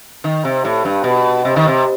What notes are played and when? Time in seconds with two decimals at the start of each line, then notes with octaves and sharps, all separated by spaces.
0.24 D#3
0.45 C3
0.65 A2
0.85 G2
1.04 B2
1.45 C3
1.56 D#3
1.68 C3